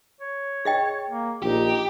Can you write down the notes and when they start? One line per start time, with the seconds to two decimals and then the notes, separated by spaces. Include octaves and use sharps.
0.21 C#5
0.65 G#4 D#5 G5
1.10 A#3
1.42 A#1 D#4 G4